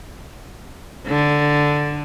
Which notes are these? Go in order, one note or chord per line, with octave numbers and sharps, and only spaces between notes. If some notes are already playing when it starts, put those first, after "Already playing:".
D3